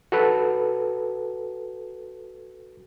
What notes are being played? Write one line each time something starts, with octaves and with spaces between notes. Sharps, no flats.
F#4 A4 B4